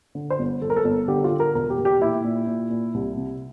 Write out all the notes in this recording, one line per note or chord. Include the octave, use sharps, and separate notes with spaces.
D3
C5
G1
G1 A4
A#4
A4
G1
D3 G4
F4
D3
A#4
E1 A#4
G4
E1
G4
A#2 E4
A#2
A#2
A#2
C2
C3